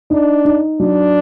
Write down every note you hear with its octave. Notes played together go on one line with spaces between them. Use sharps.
D4 D#4
D#4
F#3 D4